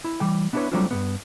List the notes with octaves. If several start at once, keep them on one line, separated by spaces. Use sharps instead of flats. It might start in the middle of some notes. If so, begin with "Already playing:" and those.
E4
E3 G3 G5
B3 D4 E4 G4 B4 C#5
F#3 G3 A3 C4 D4 F4
G2 B2 B3